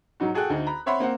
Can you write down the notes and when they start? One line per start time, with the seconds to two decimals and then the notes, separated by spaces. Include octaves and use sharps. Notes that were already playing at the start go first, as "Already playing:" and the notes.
0.20 G#2 F#3 D#4 F#4
0.34 F#4 G#4 A4 G5 F#6
0.50 D2 D#4
0.67 A#5 B5
0.86 C4 C#5 E5 F#5 B5 C6
1.00 A#3 C4 F#5